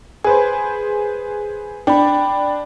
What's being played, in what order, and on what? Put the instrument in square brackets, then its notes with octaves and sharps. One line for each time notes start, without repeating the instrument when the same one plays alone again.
[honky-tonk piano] G#4 B4 C5 [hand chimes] G#5
[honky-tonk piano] D4 [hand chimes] G5 B5